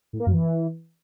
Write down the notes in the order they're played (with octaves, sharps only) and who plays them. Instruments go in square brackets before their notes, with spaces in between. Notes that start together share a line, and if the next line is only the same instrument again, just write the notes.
[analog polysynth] A2
A#3
F#2
E3